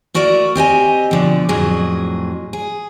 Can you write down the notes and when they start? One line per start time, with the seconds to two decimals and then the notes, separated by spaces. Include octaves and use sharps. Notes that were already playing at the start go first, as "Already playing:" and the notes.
0.14 A3 F#4 A#4 D5 E5
0.55 C4 G4 D#5 G#5
1.11 B2 D3 F3
1.49 F2 A2 F#3 G#4
2.53 G#4